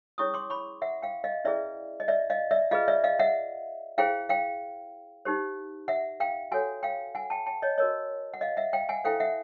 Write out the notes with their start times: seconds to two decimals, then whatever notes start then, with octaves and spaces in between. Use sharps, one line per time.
0.18 C#4 E4 G#4 C#5 C#6 D#6
0.34 C6 D6
0.50 B5 C#6
0.82 E5 F#5
1.02 F5 G5
1.24 D#5 F5
1.45 C#4 E4 G#4 B4 D5 E5
2.00 D#5
2.08 D5 E5
2.30 D#5 F5
2.51 D5 E5
2.71 F4 G#4 B4 D#5 F5
2.88 D5 E5
3.04 D#5 F5
3.19 E5 F#5
3.98 E4 G#4 C5 F5 G5
4.29 F5 G5
5.25 D#4 G4 C5
5.88 E5 F#5
6.20 F5 G5
6.51 F#4 A4 C#5 F#5 G#5
6.83 F5 G5
7.15 F#5 G#5
7.30 G5 A5
7.46 G5 A5
7.62 C#5 D#5
7.78 F#4 A#4 C#5 D#5
8.34 F#5
8.41 D#5 F5
8.57 E5 F#5
8.73 F5 G5
8.89 F#5 G#5
9.04 E4 A4 C5 F5 G5
9.20 E5 F#5